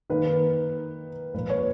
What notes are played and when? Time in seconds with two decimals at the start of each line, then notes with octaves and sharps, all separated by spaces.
0.10 D#3 A#3 B4
1.34 A#2 F3 A#3 B4
1.50 C#5